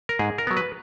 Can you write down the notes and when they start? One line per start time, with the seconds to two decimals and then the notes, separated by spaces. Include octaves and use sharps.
0.09 A#4
0.19 G#2 G#4
0.38 A#4
0.47 F#3 B3
0.57 B4